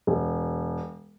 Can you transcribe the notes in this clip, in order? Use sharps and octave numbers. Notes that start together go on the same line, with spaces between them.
E1